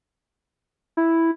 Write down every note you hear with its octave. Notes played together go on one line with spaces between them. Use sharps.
E4